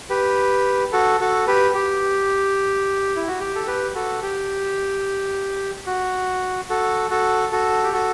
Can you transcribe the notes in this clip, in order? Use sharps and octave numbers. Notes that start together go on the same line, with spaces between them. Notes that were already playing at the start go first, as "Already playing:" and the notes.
G4 B4
F#4 A4
F#4 A4
G4 B4
G4
E4
F#4
G4
A4
G4 B4
F#4 A4
G4
F#4
F#4 A4
F#4 A4
F#4 A4
G4
F#4 A4